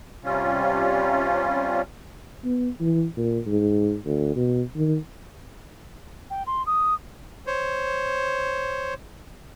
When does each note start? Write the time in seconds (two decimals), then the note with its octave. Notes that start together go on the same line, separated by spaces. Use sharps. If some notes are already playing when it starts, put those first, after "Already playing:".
0.24 C3 G3 C#4 F4
2.44 B3
2.80 E3
3.17 A#2
3.46 G#2
4.05 D2
4.36 B2
4.75 D#3
6.30 G5
6.47 C6
6.66 D#6
7.47 C5 C#5